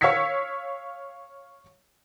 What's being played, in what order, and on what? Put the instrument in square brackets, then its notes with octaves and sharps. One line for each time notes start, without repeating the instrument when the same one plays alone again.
[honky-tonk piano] C#5 F5 E6 G#6 B6 C#7